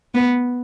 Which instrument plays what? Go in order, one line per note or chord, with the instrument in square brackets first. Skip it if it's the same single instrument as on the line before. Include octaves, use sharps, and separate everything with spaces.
[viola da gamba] B3